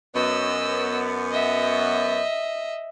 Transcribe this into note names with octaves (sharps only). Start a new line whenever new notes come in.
F#2 B3 D#5 E6
D#5 E5